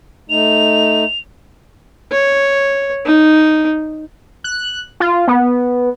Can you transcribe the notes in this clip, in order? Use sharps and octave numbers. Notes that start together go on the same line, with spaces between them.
A3 D#4 F7
C#5
D#4
F#6
F4
B3